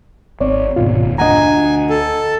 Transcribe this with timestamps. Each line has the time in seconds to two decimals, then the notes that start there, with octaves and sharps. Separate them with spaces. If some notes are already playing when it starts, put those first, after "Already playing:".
0.41 G#1 C4 C#5 D5
0.76 F1 D#2 G#2 B2 F4
1.18 D2 A#3 D4 D#5 F#5 G#5 A#5
1.90 A4